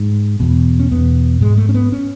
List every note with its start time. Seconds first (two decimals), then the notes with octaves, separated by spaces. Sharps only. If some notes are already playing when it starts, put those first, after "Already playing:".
Already playing: G#2
0.40 E2 B2
0.79 C#4
0.91 E2 B2 B3
1.41 G#2 G#3
1.58 A3
1.69 C#4
1.74 B3
1.92 C#4